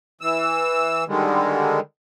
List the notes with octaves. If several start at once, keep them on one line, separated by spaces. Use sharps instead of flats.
E3 E6
D3 D#3 G3 G#3